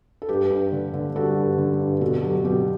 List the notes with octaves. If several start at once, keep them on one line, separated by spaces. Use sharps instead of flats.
A4
G2 G4 B4
G2
D3
D3
G3 F#4 A4
G2
D3
G2
B2 F#4 A4
F#3 G4
B2 G4